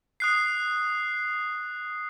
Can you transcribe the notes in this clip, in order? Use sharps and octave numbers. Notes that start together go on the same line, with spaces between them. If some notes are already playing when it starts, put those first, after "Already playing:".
D#6 F#6 C7